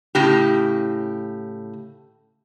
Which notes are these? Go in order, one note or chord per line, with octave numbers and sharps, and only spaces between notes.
A2 C#3 G4